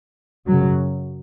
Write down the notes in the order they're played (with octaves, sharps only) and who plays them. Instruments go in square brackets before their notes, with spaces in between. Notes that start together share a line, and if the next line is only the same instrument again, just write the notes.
[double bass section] F#2 C#3 F#3